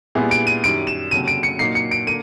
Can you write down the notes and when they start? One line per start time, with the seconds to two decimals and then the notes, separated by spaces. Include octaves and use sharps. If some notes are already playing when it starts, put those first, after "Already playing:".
0.15 A#2 G3 B3 E4 G#4
0.31 D7
0.47 D#7
0.63 F#2 D#3 G3 D7
0.87 E7
1.11 F1 D#2 C#3 F#3 D#7
1.28 D7
1.43 C#7
1.59 A#2 F#3 A#3 D#4 C7
1.75 C#7
1.91 D7
2.07 D3 A#3 D#7